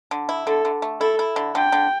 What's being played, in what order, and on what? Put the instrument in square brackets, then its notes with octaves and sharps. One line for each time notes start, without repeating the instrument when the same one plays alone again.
[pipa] D3
E4
[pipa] D3 [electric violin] A4
[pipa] D3
A3
[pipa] E4 [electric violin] A4
[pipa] E4
D3
[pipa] D3 [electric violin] G5
[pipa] D3